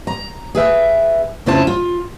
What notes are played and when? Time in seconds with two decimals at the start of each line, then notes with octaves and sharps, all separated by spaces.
0.07 A#5
0.55 G#4 B4 E5 G5
1.46 F2 C#3 E4 F4 C5 A5
1.67 F4